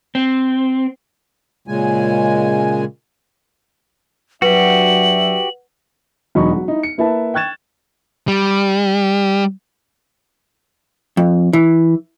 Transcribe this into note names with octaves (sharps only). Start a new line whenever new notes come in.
C4
A#2 C#3 G#3 G#5
F#3 D4 F#4 G4 B4 E5 F#5 F#7
E1 F#3 D#4 B5 C#6
F#3 F#4
D#4 E4
C#7
A#3 E4 B4 A5
G5 C#6 F#6 G#6 A6 E7
G3
F2
E3